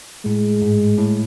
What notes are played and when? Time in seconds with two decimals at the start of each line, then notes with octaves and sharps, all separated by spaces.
0.25 A2 G#3
0.62 G#2
0.98 A2